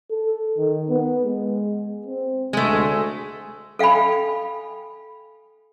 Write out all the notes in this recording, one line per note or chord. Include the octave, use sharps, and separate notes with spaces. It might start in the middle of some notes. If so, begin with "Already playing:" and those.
A4
D#3
B3
G#3
C4
D2 G#3 A3
A4 F5 G5 G#5 B5